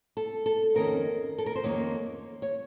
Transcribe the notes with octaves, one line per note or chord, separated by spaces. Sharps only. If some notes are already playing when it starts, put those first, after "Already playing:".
A4
A4
F2 D#3 A#3 C#4 A#4
A4
A#4
C5
F2 D#3 A#3 C#4 C#5
C#5